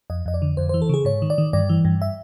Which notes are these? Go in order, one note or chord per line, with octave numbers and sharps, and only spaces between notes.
F2 D#5
F2 D#5
D5
D3
F2 C5
E3 C5
A4
C#3 G#4
G#2 C#5
D#3
D5
D#3
G2 D5
E3
G2
E5